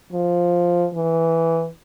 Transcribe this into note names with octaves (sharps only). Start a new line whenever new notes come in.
F3
E3